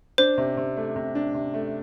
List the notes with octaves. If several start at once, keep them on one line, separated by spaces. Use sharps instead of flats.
D4 C5
C3
C3
A3
C3
D4
C3
A3